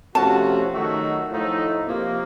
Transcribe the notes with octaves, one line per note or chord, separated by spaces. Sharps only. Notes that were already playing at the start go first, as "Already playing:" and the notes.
C3 F3 A3 C#4 F#4 A5
D#3 F#3 A3 D#4 F#4
A2 F3 A3 D#4
C3 F3 A#3